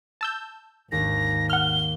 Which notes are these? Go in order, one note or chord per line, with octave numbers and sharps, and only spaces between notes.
A5 E6 G6
G#1 D#2 A#6
F#5 F6 G7